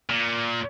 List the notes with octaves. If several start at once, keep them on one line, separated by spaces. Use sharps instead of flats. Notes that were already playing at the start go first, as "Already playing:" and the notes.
A#2